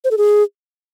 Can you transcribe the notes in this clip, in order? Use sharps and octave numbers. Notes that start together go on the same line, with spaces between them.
C5
A4
G#4